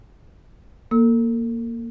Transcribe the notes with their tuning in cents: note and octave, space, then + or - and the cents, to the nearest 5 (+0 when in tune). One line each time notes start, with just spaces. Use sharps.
A#3 +0 A4 +30 E6 -35